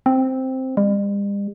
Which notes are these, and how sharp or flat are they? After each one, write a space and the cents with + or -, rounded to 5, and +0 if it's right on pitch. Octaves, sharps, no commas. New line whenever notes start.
C4 +0
G3 +45